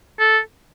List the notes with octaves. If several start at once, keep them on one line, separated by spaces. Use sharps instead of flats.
A4